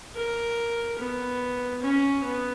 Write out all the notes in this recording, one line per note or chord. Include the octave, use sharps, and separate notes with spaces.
A#4
B3
C#4
B3